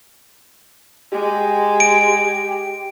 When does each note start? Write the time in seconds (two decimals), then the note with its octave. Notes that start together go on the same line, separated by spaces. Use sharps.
1.12 G#3 G4
1.80 D7